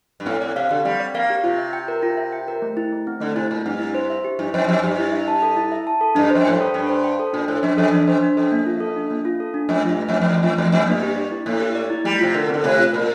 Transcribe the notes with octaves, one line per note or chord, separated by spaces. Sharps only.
G2
A2 C4
A2 D5
C3 F5
D3 G4
G3 C4
D5
A#3 F5
G4
C3 F4
E5
G5
A#4
F4
E5
G5
A#4
A3
E4
A3
C4
D3 A3
C3 E4
A#2 A3
G2 C4
E4
C5
E5
G4
G2 E4
F2 C5
F2 E5
G2 G4
E4
E5
A5
A4
E4
E5
A5
A4
G2 D4
F2 C5
A2 G5
G2
A4
G2 D4
C5
G5
A4
A#2 D4
A2 C5
F2 D4
F2 A4
E2 D4
F2 C5
D4
F2 A4
A#3
F4
A4
D4
A#3
F4
A4
D4
F2 A3
G2 F4
A3
F2
C4
F2
E2 A3
F2 F4
E2 A3
F2 C4
G2 A#3
G4
D5
E4
A2 A#3
G4
D5
E4
G3 A3
C3 F4
D3 A#4
D3 C4
C3 A3
F4
A#2 A#4